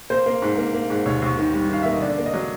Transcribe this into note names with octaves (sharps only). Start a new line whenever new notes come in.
A#3 C5
A#3
G#2
A#3
A#3
G#2
D#2 C#5
D#2
D#3
G3
D#3 F5
A#3 E5
D#5
D3 D5
A#3
D#5
F#3